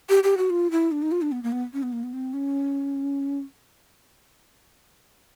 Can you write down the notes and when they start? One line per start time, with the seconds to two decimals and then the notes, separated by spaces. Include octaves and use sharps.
0.09 G4
0.23 G4
0.37 F#4
0.50 F4
0.71 E4
0.92 D4
1.02 D#4
1.12 F4
1.22 D4
1.32 B3
1.43 A#3
1.52 B3
1.73 C#4
1.83 B3
1.93 A#3
2.03 B3
2.13 C4
2.33 C#4